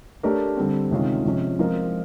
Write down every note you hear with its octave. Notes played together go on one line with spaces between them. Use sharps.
A3 D4 G4 A#4 C#5
D3 G3 C4
C3 D#3 G#3 C#4 F4
C3 F3 G#3 C#4
F3 G#3 C4 F4 A#4